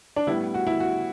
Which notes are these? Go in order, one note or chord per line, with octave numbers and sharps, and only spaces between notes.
D4
A2 G3 B3 E4
F#4
E4
F#4